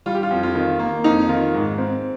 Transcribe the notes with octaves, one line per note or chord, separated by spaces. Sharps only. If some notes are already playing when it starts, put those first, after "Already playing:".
G3 F4
G4
F4
F2
F4
D#3
A#3
F2 D#4
D#3 F4
G#2
C4